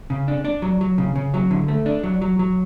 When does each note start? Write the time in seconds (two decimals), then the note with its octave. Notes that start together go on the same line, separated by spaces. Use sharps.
0.10 C#3
0.28 D4
0.45 D4
0.62 F#3
0.81 F#3
0.98 C#3
1.16 C#3
1.34 F#3
1.51 D3
1.68 A3
1.86 D4
2.03 F#3
2.22 F#3
2.39 F#3